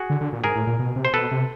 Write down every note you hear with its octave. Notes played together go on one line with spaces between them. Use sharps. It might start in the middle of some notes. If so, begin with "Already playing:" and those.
Already playing: F#4 G#4
D3
D3
A#2
G#2 G#4 A#4
A2
A#2
B2
C3
C5
B2 A4 B4
C3